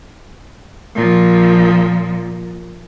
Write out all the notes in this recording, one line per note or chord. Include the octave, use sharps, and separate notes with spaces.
A#2 F3